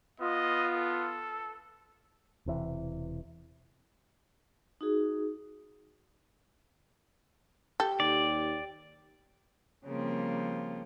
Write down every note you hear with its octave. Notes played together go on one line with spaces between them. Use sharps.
B3 F4 D#5
A4
E1 C3 E3
D#4 F#4 G#4
G4 A4 G5
D#2 D5
C#3 F3 G3 A#3 C4 F4